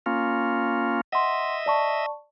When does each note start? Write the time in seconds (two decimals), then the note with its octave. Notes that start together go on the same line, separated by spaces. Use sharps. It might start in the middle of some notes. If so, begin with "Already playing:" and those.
0.06 A#3 C#4 F4
1.12 D#5 E5 F#5 C6
1.66 D5 A5 C#6